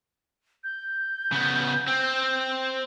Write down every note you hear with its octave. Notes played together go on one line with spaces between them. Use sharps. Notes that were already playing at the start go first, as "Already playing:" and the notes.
G6
C#3 B3
C4